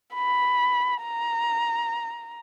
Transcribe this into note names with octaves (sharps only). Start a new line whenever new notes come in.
B5
A#5